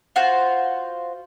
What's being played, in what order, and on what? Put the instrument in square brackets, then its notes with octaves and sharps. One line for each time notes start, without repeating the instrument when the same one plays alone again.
[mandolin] F4 F#4 C5